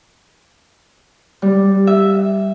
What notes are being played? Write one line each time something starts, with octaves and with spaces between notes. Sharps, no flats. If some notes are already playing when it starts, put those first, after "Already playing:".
G3
E5